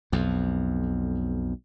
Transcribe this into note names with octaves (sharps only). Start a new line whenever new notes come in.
B1 F2